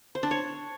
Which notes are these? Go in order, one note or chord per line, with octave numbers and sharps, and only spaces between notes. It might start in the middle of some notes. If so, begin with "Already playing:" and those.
C5
D4
C#5